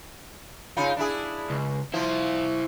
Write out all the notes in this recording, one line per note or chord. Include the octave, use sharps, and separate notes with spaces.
C#3 D#4 F4
D4 E4 G#4
C#2
F3 E4 C5